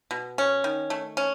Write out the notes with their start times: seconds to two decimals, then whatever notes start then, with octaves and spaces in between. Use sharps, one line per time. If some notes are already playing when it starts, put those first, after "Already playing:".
0.11 B2
0.38 C#4
0.64 D#3
0.90 A3
1.17 C#4